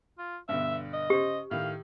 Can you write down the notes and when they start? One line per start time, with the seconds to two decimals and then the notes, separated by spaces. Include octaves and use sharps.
0.19 F4
0.49 G2 B2 D3 E5
0.93 D#5
1.10 C#3 G4 C5
1.51 A2 D#3 F5